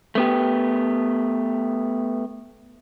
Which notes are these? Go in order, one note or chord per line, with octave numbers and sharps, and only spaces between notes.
A3 B3 G4